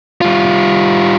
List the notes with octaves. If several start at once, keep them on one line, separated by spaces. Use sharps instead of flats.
G3 F4